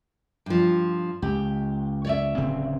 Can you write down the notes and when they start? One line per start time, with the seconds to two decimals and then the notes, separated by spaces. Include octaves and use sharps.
0.46 G2 F3
1.22 C#2 G4
2.05 C#5 D5 E5
2.37 D1 C#3 C4